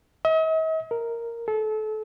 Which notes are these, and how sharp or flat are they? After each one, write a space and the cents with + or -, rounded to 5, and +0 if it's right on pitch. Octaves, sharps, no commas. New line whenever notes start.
D#5 +45
A#4 -5
A4 -30